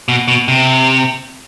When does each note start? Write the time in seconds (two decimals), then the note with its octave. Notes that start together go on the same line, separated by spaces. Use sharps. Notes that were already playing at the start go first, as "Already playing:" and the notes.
0.09 B2
0.28 B2
0.48 C3